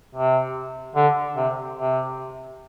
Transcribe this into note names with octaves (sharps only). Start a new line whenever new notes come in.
C3
D3
C3
C3